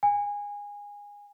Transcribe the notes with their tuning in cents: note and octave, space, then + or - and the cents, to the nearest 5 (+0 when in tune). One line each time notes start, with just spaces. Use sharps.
G#5 -20